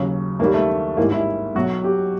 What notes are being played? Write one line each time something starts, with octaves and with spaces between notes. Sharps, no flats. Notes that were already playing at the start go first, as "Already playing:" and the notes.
Already playing: D#2 C#3 F#3
D#2 D#3 G3 A#3
A3
A1 G#2 E3 G3 A#3
E4
B1 B2 F#3 F#4
G4